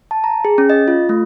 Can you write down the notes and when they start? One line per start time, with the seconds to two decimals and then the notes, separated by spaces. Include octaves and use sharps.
0.11 A5
0.24 A#5
0.45 G#4
0.58 C#4
0.70 D#5
0.88 F4
1.09 A3